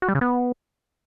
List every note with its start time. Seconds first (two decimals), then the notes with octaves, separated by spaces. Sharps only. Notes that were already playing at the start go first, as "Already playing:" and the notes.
0.02 F#4
0.09 G3
0.15 C#3
0.21 B3